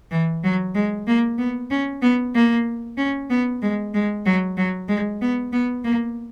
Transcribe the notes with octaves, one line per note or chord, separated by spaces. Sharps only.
E3
F#3
G#3
A#3
B3
C#4
B3
A#3
C#4
B3
G#3
G#3
F#3
F#3
G#3
B3
B3
A#3